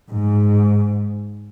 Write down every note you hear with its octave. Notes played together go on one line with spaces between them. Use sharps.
G#2